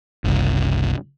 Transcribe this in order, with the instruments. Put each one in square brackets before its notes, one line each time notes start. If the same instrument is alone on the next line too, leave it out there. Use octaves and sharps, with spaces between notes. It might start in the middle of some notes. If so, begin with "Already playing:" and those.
[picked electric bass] F#1 C2